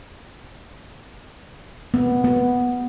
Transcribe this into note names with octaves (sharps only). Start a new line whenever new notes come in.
B3
B3